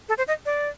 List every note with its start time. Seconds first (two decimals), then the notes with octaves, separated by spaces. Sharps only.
0.09 A4
0.18 C5
0.28 D#5
0.46 D5